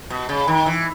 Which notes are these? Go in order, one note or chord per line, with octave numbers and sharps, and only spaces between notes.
B2
C#3
D#3
E3